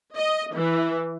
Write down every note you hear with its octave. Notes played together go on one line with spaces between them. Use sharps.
D#5
E3